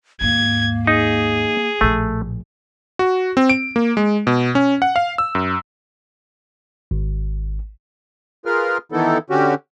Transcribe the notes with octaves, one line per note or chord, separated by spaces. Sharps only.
D#2 G#2 A#3 G#6
D#4 G#4
A#1 A2 A3
F#4
C4
D7
A#3
G#3
B2
C#4
F#5
F5
E6
F#2
G#1
F4 G#4 A#4 B4 F6
D#3 E3 B3 D#4 E4 A4
D3 C#4 F#4 G4